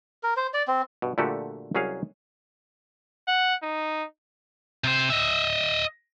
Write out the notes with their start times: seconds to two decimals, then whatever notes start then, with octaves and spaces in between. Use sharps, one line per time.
0.23 A#4
0.37 C5
0.54 D5
0.68 C4
1.02 G2 B2
1.18 A#2 D3 F3 A3 F#4 G4
1.75 C2 F#3 C#4 G#4 C#5 F5
3.27 F#5
3.63 D#4
4.84 C3 C5
5.10 D#5 E5